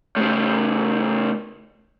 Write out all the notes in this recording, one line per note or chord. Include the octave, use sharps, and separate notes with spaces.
A2 C#3